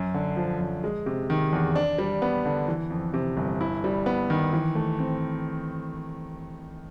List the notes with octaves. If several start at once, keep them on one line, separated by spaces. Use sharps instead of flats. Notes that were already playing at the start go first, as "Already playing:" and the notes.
Already playing: F#2
D3
F3
F#2
G#3
C3
D#3
E2
D4
G3
B3
D3
E3
F2
C3
G1
E4
G3
B3
D#3
E3
A3
C4